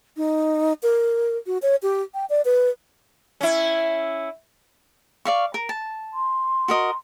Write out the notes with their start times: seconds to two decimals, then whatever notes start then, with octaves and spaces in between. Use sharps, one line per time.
0.17 D#4
0.83 A#4
1.47 F#4
1.62 C#5
1.82 G4
2.14 G5
2.30 D5
2.45 B4
3.41 C#4 E4
5.25 D5 F5 C#6
5.54 A#4
5.69 A5
6.13 C6
6.68 F#4 A#4 D#5